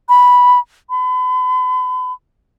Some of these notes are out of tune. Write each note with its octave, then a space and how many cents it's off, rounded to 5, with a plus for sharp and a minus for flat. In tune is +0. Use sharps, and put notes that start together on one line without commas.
B5 -5
B5 +40